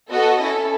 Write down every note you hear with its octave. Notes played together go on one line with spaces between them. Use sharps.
B3 F#4 A4 D#5
C#4 E4 A4